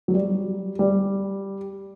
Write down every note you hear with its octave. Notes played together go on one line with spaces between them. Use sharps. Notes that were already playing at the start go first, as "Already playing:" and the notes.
F#3
G3
G3